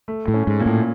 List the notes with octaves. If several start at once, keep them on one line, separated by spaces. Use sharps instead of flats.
A3
A2
C#4
G#2
A#2
A2